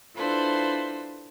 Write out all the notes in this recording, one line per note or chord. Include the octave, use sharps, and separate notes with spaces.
D4 E4 F4 A4 B4 C5